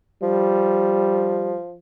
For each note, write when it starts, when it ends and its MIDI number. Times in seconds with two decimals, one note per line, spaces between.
0.22 1.78 53
0.22 1.57 55